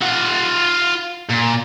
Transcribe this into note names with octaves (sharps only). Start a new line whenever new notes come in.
F4 F#5
A#2